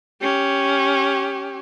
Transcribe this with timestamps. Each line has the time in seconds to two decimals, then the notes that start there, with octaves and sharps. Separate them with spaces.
0.21 C#4 G4